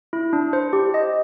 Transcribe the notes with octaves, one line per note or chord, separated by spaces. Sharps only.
E4
D4
C5
G4
D#5